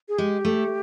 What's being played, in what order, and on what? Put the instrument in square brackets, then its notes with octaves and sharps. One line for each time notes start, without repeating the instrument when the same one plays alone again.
[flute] G#4
[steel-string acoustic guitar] G#3 [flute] G4
[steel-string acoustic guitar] A3